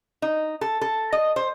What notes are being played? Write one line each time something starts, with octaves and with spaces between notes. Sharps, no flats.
D#4
A4
A4
D#5
C5